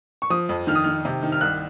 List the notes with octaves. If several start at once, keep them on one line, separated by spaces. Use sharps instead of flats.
C#6
F3 D#6
F2
D#3 F6
D#6
D#3 F6
C3
D#3
F6
C2 F#6